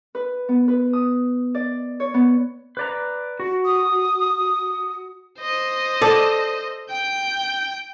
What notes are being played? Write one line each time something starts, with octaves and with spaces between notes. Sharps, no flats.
B4
B3
B4
D#6
D5
C#5
B3
B4 D5 A#5
F#4
D#6
C5 D#5
A4 D5
G5 G6